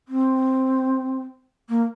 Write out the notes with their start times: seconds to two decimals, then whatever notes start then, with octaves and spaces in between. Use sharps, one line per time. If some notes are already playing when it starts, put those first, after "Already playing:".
0.08 C4
1.69 A#3